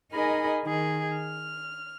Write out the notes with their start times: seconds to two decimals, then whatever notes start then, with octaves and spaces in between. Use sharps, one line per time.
0.13 D#4 G#4 A#4 D#5 G#5 B5
0.63 D#3 G#4
1.16 F6